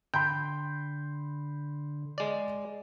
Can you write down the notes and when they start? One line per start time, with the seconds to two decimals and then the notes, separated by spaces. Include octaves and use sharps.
0.14 D3 G5 B5 C6 G6
2.18 G#3 D5